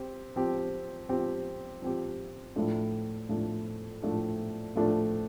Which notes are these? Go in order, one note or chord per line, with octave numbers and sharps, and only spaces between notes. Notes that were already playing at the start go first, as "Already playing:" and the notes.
Already playing: C4 G4
F3 C4 G4
F3 C4 G4
F3 C4 G4
A2 F3 A3 D4
A2 F3 A3 D4
A2 F3 A3 D4
A2 F3 A3 D4